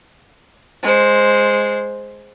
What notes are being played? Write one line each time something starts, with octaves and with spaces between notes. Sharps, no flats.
G#3 C5